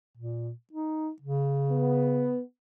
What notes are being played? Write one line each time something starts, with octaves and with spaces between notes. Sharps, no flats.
A#2
D#4
C#3
B3